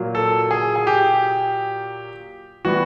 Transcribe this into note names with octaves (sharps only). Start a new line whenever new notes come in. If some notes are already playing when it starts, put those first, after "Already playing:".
Already playing: A#2 F#3 A#3
A4
G#4
G#4
G4
E3 G3 B3 F#4